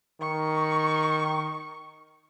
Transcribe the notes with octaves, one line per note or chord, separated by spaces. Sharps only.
D#3 C#6